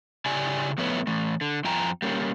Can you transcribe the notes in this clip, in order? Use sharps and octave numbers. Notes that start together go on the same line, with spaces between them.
C#3 E4 G4 D5 G#5
A2 F3 A3 B3 B4 C#5
E3 A3
D3
F2 F3 G5 G#5 A#5
G3 A#3 C#4